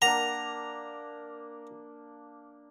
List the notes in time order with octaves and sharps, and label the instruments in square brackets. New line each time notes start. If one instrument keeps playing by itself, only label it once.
[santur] A#3 D4 [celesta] F#5 [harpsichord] A#5